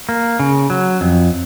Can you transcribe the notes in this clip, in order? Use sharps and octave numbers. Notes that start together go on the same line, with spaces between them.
A#3
C#3
F#3
F2